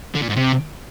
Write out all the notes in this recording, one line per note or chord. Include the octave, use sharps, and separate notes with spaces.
D3
A#2
G#2
C3